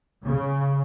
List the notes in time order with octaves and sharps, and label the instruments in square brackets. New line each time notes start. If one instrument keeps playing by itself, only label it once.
[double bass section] C#3